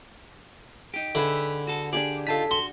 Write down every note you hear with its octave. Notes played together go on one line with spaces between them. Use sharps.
D#4 G4
D3 G#4 B4 E5
F#4 A4
D4 G4 G#4 D5
D#4 F4 A4 A5 B6
F#4 C6